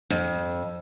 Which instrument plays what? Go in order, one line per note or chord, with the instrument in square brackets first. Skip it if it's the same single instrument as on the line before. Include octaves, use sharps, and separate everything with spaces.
[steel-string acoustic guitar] F2